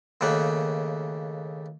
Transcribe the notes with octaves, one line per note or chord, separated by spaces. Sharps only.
D#2 C#3 A3 A#3 F#5